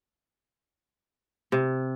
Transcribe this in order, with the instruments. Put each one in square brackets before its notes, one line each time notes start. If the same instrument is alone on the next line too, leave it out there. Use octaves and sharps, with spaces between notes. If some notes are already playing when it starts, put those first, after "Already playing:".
[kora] C3